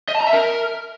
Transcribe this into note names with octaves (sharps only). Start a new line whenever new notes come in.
D#5
A5
A#5
E5
A#4